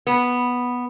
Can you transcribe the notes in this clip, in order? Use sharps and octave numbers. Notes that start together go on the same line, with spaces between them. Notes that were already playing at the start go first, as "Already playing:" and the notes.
B3